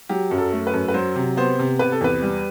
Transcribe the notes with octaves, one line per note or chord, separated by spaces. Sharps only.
F#3 G4
F#2
A4
A3
B4
F#2
B4
F#3 C5
C3
B3 C5
C3
C3 B4
A4
E2 B4
G3